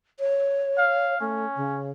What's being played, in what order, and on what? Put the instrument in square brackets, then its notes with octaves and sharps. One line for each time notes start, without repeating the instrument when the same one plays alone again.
[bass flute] C#5
[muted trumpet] F5
[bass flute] A3 [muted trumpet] C#4
[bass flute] C#3